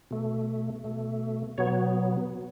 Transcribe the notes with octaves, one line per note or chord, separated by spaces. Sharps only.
B2 A3
B2 A3
B2 F#3 B3 C#5